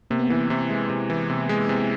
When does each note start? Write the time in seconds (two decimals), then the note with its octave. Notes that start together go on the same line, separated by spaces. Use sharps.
0.11 C3 A#3
0.19 B3
0.27 A#3
0.30 E3
0.50 C3 E4
0.70 G#3
0.90 C3
1.10 E3
1.30 C3
1.49 G#3
1.69 C3